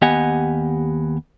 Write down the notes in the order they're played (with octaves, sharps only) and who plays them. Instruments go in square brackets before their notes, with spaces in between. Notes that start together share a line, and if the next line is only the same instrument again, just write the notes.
[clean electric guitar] D#2 B3 G4 D#5 F#5 G#5